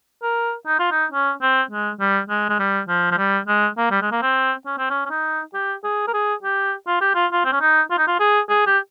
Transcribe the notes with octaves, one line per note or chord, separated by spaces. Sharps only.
A#4
D#4
F4
D#4
C#4
C4
G#3
G3
G#3
G#3
G3
F3
F3
G3
G#3
A#3
G3
G#3
A#3
C4
C#4
C4
C#4
C#4
D#4
G4
G#4
A#4
G#4
G4
F4
G4
F4
F4
C4
C#4
D#4
F4
D#4
F4
G#4
G#4
G4